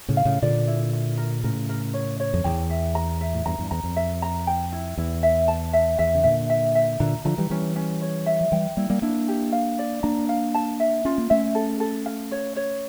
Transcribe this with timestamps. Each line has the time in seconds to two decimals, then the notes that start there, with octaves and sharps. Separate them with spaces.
0.08 A2 C#3
0.17 F5
0.25 A2 C#3
0.42 A#2 D3 D5
0.67 E4
0.93 E4
1.18 A#4
1.44 A2 C#3 A#4
1.69 A#4
1.94 C#5
2.20 C#5
2.34 F2
2.44 E2 G5
2.70 E5
2.95 A#5
3.21 E5
3.34 A2
3.46 E2 G2 A#5
3.59 E2 G2
3.71 E2 A#5
3.84 F2
3.96 E5
4.22 A#5
4.47 G5
4.72 E4
4.97 E2 E4
5.23 E5
5.48 A5
5.73 E5
5.99 E2 E5
6.15 C#3
6.24 A#2 D3 E5
6.50 E5
6.75 E5
7.00 A#2 D3 A#5
7.25 D3 F3 A#5
7.38 E3 G3
7.50 E3 G3 C#4
7.76 C#4
8.02 C#5
8.26 E5
8.41 F3
8.52 E3 G3 G5
8.77 G3 A#3 E4
8.90 G3 A#3
9.02 A#3 D4 E4
9.28 G4
9.52 F5
9.79 D5
10.03 A#3 D4 A#5
10.29 F5
10.55 A5
10.80 E5
11.05 C#4 F4
11.18 A#3
11.30 A3 C#4 E5
11.55 A4
11.80 A4
12.06 F5
12.31 C#5
12.56 C#5